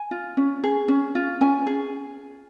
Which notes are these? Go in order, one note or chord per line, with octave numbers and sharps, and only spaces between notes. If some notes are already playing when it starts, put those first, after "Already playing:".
Already playing: G#5
F4
C#4
G#4
C#4
F4
C#4 G#5
G#4